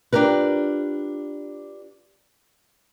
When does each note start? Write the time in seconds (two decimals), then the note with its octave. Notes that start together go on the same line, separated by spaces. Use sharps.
0.13 D4 F4 G4 A#4 B4